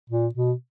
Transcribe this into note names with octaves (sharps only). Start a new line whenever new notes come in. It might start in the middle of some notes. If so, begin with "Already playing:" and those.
A#2
B2